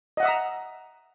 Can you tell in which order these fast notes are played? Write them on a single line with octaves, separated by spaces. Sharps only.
D#5 F#5 E5 D#6 A#5